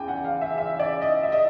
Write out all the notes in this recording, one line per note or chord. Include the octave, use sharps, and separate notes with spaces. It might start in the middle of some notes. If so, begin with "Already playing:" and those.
Already playing: E2 C#3 G5 G#5
F#5
F5
E5
E5
D5
D#5
E5
D#5